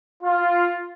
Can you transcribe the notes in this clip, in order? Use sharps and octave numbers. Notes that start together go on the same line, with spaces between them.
F4